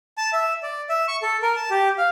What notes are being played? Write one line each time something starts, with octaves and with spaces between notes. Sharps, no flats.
A5
E5
D5
E5
C#6
A4
A#4
A5
G4
F5